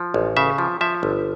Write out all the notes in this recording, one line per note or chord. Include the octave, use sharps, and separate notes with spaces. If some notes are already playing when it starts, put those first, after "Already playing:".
Already playing: F3
A1
C#3 E5
F3
F3 E5
G1